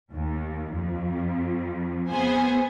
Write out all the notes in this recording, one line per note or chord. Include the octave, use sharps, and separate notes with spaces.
D#2
F2
B3 G#4 C5 G#5